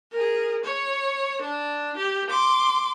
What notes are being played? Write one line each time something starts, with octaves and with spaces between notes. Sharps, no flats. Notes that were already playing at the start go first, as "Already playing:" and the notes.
G#4 A#4
C#5
D4
G4
C6 D6